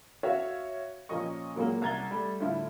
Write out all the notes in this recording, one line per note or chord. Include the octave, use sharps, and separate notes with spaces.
F#4 C#5 E5 F5
A#2 F3 A#3 C#4 D#5 C#6
A#2 F#3 G#3 A#3
C2 A#5 G#6 A6 G7
G3 A3
A2 D3 E4 F4